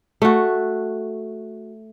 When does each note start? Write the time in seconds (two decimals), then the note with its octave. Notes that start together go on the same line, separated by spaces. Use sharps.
0.22 A3 F#4